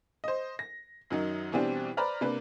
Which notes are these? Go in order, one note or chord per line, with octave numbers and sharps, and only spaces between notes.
C5 D#5
A#6
F#2 D#3 F#3 D#4
B2 E3 G3 C4 D4 G4
B4 C5 D5 A#5 B5 F6
C3 A#3 D4 B4